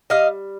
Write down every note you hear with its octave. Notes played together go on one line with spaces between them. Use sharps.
G3 D#5 F5